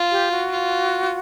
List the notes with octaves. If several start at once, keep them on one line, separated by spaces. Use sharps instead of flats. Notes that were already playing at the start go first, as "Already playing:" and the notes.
Already playing: F4
G4
F#4
F4